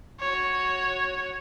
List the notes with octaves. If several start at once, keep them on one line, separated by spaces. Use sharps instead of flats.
F#4 C#5